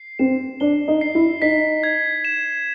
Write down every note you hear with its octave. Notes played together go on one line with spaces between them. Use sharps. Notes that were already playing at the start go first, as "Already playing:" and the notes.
Already playing: C7
C4 E7
D4 G7
D#4
C7
E4
D#4 B6
G#6
E7